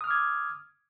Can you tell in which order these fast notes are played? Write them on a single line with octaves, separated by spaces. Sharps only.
D#6 F6 D6 G#6